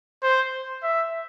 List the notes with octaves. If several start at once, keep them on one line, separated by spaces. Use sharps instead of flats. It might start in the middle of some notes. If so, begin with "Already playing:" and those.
C5
E5